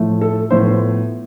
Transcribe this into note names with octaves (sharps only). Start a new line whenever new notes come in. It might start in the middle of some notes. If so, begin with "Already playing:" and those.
Already playing: A2 F3 A3
A4
A2 F3 B3 C5